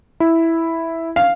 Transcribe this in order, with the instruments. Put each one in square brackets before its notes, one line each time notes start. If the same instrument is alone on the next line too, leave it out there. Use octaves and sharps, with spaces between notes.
[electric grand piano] E4
[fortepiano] F5